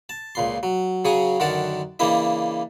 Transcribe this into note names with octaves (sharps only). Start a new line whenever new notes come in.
A5
C#2 A#2 C6
F#3
C#3 F#3 G#4 C#5 G#5 D#6
F#2 D3 D#3 A#4 F#5 A5
C#3 E3 A#3 D4 E4 D#5